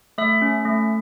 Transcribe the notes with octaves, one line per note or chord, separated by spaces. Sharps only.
A3 E5
C#4
A3